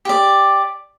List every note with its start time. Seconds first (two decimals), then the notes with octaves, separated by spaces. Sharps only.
0.05 G4 D5